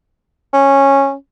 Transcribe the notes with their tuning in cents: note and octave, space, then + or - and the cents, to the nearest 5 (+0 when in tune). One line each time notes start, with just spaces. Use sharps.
C#4 -10